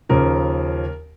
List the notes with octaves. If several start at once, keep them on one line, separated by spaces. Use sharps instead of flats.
D#2 C#3 F3 A#4